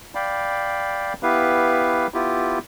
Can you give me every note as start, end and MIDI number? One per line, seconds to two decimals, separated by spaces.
0.15 1.13 74
0.15 1.13 77
0.15 1.13 79
0.15 1.13 83
1.23 2.07 59
1.23 2.07 64
1.23 2.07 67
1.23 2.07 71
1.23 2.07 77
2.14 2.59 59
2.14 2.59 64
2.14 2.59 65
2.14 2.59 67